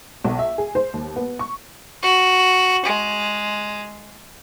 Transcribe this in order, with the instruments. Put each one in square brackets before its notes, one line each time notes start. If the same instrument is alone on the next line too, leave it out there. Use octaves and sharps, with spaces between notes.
[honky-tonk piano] B1
E5
G#4
C5
D#2
B3
C#6
[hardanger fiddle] F#4
G#3